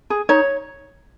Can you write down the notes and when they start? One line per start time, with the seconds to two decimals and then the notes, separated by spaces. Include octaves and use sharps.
0.10 G#4
0.29 D#4 C#5